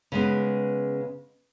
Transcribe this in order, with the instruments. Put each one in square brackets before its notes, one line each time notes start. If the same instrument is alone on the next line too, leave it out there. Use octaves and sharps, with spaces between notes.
[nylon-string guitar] C#3 G#3 B3